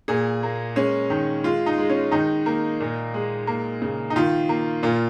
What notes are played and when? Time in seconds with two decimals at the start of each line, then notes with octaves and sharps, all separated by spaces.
0.08 A#2 G#4
0.43 A#3
0.76 G#3 C#4
1.10 D#3
1.44 G#3 F4
1.66 D#4
1.78 G#3
1.90 C#4
2.12 D#3 D#4
2.46 A#3
2.80 A#2
3.14 G#3
3.47 A#3
3.82 C#3
4.10 D#4
4.16 D#3 F4
4.49 A#3
4.83 A#2 F4